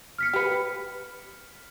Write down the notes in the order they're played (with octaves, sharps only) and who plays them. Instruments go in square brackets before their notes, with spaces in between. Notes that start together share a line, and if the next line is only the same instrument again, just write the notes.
[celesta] F6 B6 C#7
[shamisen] G4 B4